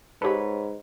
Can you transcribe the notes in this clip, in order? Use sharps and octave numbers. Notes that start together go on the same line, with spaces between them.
G#2 G4 A4 B4 C#5 B5